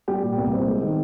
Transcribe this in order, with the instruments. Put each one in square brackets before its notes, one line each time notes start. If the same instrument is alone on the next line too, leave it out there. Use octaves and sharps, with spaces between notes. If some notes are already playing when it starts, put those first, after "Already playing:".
[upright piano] G3 G4
A#2
C2
C4
G#3
D#3